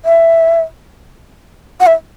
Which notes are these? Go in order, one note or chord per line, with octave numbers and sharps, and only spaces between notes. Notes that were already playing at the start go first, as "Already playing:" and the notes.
E5
F#5
E5